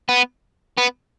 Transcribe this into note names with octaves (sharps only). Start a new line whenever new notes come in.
B3
B3